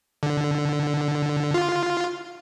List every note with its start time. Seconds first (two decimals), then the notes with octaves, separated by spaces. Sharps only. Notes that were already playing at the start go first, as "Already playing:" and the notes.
0.23 D3
1.54 F4